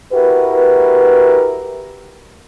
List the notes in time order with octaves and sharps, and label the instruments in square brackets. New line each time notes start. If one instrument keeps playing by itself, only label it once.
[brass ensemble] E4 F#4 G4 A#4 B4